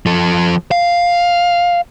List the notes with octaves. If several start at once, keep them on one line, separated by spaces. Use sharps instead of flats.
F3 A4
F5